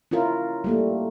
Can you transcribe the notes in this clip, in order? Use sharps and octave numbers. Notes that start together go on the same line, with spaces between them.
C#4 E4 F4 A#4
G3 A3 A#3